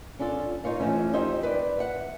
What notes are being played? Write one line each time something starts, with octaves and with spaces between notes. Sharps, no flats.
C#4 D4 F4 A4
D#4 F4 C#5 F5
E3 F3 A3 C#4
D#4 G4 C5 D#5 E5
B4 D5
E5 F#5